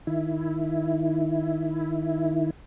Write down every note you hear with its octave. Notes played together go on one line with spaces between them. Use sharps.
D#3 E4